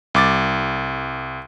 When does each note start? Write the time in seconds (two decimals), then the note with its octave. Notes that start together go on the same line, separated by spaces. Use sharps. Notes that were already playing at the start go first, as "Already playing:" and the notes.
0.15 C2 D6 A6